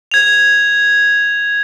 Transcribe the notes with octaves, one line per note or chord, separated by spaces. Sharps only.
G#6 F7